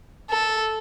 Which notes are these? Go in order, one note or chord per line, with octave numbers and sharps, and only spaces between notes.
A4